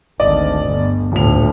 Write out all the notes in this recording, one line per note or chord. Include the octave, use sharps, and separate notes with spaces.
G#1 D2 D5 D#5
G1
D#1 D2 A2 F7